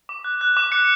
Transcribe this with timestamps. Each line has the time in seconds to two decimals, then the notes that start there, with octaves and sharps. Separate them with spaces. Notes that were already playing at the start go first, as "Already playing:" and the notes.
0.09 D6
0.24 F#6
0.41 F#6
0.57 D6
0.72 F#6 C#7